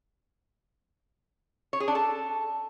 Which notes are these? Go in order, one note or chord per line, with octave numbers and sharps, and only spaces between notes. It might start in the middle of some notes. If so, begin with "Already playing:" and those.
C#5
G#4
D4
A4